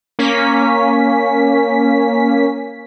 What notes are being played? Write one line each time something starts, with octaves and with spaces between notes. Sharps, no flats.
A#3 C#4 B6